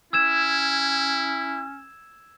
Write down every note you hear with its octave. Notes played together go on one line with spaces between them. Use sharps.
C#4 E4 E6 G#6 E7